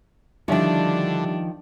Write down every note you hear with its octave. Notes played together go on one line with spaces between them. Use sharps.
D3 D#3 F3 G3 D4 E4 E5